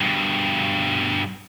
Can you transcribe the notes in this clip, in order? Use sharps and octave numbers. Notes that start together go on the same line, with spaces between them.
G2 B2